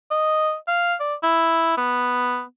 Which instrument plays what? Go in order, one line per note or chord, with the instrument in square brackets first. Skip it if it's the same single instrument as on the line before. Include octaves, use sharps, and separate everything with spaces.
[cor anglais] D#5
F5
D5
E4
B3